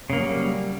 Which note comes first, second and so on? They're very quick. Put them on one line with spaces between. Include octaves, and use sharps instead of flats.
C#3 A#3 F#3 G3